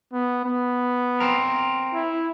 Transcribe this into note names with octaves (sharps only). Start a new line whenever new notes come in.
B3
B3
C4 A#4
E4